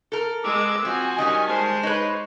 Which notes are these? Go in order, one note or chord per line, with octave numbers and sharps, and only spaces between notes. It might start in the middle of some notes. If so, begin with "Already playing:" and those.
A4 A#4
G#3 D#5 D6 E6
F3 C4 F#4 G#5
D#3 G3 C#4 D#5
G#3 C5 A5
D#4 B4 C#5